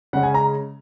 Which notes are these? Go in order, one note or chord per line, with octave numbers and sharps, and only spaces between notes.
C#3 G#3 C#4 F#5
G#5
A#5